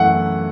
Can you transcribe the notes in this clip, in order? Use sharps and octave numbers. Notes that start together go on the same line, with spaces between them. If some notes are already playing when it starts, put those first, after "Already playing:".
Already playing: F#2 E3 A3 F#5